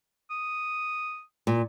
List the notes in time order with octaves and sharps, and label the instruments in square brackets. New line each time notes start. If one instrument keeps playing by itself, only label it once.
[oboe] D#6
[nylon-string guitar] A#2